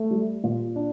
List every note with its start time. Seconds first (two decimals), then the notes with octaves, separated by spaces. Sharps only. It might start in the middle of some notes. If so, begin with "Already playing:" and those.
Already playing: A3
0.11 G3
0.44 A#2
0.76 D4